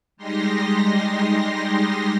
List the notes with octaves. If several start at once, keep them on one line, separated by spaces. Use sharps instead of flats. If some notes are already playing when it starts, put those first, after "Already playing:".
G3 G#3 D#4 G4 C6 A#6